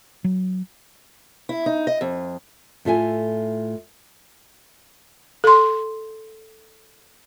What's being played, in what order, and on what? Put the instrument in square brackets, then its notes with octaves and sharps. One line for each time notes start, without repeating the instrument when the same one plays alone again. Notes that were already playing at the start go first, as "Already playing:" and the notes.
[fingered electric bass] F#3
[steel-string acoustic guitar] E4
D#4
D#5
F2
[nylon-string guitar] A2 F4 A4 E5 F#5 G#5
[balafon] A4 C6